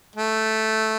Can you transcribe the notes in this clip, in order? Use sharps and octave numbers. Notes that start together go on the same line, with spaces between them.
A3